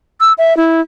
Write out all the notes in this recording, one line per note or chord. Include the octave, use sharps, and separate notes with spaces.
E6
E5
E4